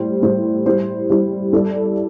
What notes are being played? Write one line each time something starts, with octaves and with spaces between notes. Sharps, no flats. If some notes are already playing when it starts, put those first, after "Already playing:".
Already playing: A2 G3 C5
A2 G3 E4 C5
G3 E4 C5
G3 E4 C5
G3 E4 A4 D5